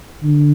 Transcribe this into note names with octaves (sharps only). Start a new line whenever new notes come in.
D3